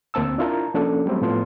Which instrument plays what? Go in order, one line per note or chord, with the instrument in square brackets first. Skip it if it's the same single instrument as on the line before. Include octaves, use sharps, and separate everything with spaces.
[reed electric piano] D2 A#3 C4 A5 E6
D4 E4 F4 A#4 A5 A#5
F3 A#3 C#4 D4 A4
F#3 G3 A3 C4 G4
A2 F3 B3 F4 A5 C6